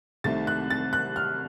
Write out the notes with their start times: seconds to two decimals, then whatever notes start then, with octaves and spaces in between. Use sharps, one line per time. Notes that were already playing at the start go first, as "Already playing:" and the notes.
0.24 C2 C3 D#3 A3 A6
0.47 F#6
0.70 A6
0.93 F#6
1.16 F6